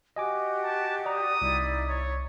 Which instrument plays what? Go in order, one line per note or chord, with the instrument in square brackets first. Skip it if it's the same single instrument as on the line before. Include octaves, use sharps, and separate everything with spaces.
[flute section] F#4 G4 [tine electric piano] D#5 G#5 D6
[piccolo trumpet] A5
[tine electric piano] D5 A#5 [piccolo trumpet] D#6
[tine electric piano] C2 [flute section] D#4 E4 D5
[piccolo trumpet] C#5